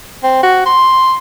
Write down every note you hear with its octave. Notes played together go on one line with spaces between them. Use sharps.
C4
F#4
C6